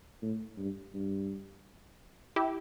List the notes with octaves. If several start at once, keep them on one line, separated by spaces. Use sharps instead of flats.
A2
G2
G2
E4 G4